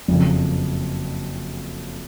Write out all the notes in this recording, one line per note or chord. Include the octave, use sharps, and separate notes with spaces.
F#1 F2 C#3